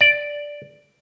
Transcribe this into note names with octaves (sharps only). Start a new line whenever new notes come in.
D5